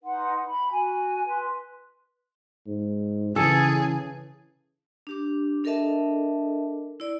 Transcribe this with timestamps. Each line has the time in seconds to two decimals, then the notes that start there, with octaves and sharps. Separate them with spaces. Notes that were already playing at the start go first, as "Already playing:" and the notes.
0.03 D#4 B4 F#5 C6
0.45 B5
0.71 F#4 G#5
1.26 B4 C6
2.67 G#2
3.36 C#3 E3 G#4 A4
5.07 D4 G4 D6
5.64 D4 A4 A#4 D#5 E5 A5
7.00 E4 D5